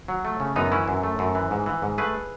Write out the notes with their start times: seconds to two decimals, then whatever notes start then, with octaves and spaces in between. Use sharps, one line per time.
0.08 F#3
0.25 A3
0.40 C#3
0.56 F#2 B3 D#4
0.72 E3 C#4 E4
0.88 F#2
1.03 A3
1.19 F#2
1.35 E3
1.51 G#2
1.66 E3
1.82 G#2
1.98 A3 G#4 B4